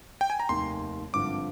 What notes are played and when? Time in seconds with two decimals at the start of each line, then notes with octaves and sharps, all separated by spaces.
0.21 G5
0.30 G#5
0.40 A#5
0.49 F1 D#2 D#3 C6
1.13 G#1 G2 D3 F3 C4 D6